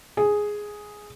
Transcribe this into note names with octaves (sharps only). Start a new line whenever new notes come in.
G#4